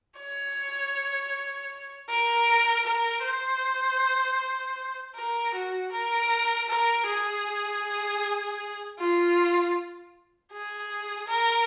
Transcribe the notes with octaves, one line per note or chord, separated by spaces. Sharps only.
C#5
A#4
A#4
C5
A#4
F#4
A#4
A#4
G#4
F4
G#4
A#4